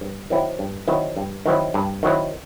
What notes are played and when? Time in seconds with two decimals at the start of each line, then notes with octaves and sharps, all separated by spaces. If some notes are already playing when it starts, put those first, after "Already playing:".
0.01 G2
0.30 D#3 F#3 C4 E4
0.59 G2
0.88 D#3 F#3 C4 E4
1.17 G2
1.46 D#3 F#3 C4 E4
1.74 G2
2.03 D#3 F#3 C4 E4